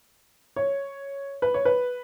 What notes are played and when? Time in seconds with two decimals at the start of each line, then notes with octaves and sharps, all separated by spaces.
0.56 C#5
1.42 B4
1.54 C#5
1.65 B4